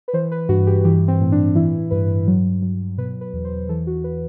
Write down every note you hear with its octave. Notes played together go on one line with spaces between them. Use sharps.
B4
E3 C5
B4
G2 F#4
G4
E3 G4
C4
A2
D4
E3 E4
G2 B4
F#3
F#3
B2 B4
B4
E2
C5
E3 A4
F#4
B4